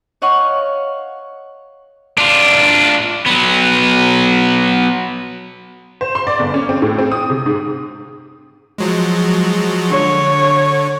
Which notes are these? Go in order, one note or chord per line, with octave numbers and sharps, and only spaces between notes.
C#5 D#5 F5 F#5 C#6
D4 F4
F#3 B3
C5
C6
D5
G1
C#4
C4
A2
C4
D#6
C3
G#2
F3 F#3 G#3
D3 C#5